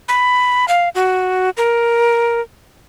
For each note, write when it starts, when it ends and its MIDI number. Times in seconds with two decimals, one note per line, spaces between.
0.08 0.65 83
0.68 0.89 77
0.95 1.50 66
1.57 2.41 70